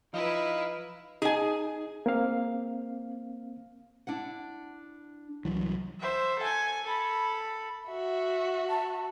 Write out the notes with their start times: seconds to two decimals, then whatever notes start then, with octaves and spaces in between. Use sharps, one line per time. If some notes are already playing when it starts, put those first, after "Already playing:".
0.14 F3 D#4 E4 B4 F5
1.22 D#4 G#4 G#5
2.06 A#3 C4 F5
4.07 D4 E4 F#5
5.45 C2 E3 F#3
6.00 C5 E5
6.39 A4 G#5
6.84 A4 B5
7.87 F#4 E5
8.69 A5